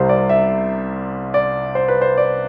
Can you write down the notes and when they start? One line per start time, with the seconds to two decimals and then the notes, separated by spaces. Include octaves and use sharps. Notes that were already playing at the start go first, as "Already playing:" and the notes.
Already playing: C2 C3 G3 C5
0.09 D5
0.29 E5
1.34 D5
1.75 C5
1.88 B4
2.01 C5
2.17 D5